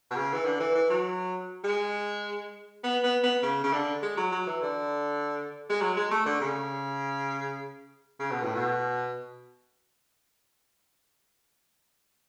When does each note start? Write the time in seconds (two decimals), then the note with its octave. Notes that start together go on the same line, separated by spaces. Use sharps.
0.11 B2
0.16 C#3
0.34 E3
0.45 D3
0.60 E3
0.75 E3
0.90 F#3
1.64 G#3
2.84 B3
3.03 B3
3.24 B3
3.43 C#3
3.64 C#3
3.73 D3
4.03 G#3
4.17 F#3
4.32 F#3
4.47 E3
4.62 D3
5.70 G#3
5.81 F#3
5.97 G#3
6.11 A3
6.26 D3
6.41 C#3
8.20 C#3
8.31 B2
8.43 A2
8.54 B2